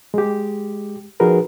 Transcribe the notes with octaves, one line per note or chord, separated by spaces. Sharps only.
G#3 G4
F3 D#4 F#4 G#4 A#4 B4